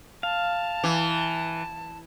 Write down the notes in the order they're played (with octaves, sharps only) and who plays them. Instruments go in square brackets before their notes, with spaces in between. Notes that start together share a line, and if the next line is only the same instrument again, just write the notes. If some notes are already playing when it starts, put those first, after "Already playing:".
[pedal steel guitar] F5 [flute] A5
[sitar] E3